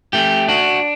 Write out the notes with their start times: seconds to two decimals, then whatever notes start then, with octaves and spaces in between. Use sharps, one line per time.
0.13 A3 G4
0.49 D4 F#4